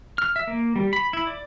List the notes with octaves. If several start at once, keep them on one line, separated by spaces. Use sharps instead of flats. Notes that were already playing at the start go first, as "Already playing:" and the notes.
F6
E5
A#3
G3
B5
E4
D5